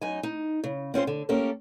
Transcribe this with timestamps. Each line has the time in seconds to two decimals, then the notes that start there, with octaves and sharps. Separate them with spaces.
0.01 F#2 D#4 G#5
0.23 D#4
0.64 C#3
0.94 C4 C#4 F4 C5
1.07 D3
1.29 A#3 C#4 G4 A4 A#4